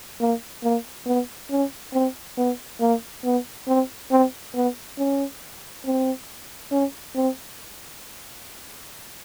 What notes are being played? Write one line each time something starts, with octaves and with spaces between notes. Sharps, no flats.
A#3
A#3
B3
C#4
C4
B3
A#3
B3
C4
C4
B3
C#4
C4
C#4
C4